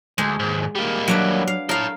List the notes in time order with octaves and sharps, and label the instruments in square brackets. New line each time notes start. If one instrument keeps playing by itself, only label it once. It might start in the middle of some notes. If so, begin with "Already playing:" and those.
[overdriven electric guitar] D2 [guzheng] G#3
[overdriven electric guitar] D#2 G#2
G3 A#3
[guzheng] F#3 D4 B4
F5
[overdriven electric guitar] A4 C#5 [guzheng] A#4 F5